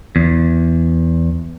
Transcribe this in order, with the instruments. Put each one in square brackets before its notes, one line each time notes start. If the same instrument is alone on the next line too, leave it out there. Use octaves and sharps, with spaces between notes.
[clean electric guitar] E2